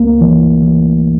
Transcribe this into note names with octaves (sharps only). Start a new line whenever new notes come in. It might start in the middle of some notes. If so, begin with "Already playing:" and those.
Already playing: C#2 A#3
E3
E3